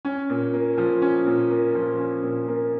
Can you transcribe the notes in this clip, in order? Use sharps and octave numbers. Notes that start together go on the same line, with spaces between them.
C#4
A#2
A#3
F3
C#4
A#2
A#3
F3
C#4
A#2
A#3